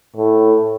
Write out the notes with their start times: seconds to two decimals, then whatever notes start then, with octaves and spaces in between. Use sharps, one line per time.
0.16 A2